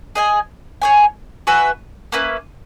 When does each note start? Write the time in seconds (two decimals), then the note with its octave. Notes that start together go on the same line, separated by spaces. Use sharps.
0.15 G#4 D#5 G#5
0.82 G#4 C#5 G#5
1.47 F#4 B4 E5 G#5
2.12 A#3 C#4 E4 B4